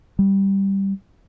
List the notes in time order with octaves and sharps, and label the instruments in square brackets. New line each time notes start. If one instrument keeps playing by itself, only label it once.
[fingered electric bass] G3